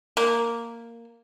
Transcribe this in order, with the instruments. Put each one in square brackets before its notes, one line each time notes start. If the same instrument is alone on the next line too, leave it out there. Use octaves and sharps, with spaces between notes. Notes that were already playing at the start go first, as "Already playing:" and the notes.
[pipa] A#3